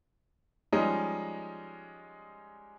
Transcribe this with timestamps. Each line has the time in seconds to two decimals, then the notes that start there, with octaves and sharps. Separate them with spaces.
0.72 F3 G3 G#3 C#4 D#4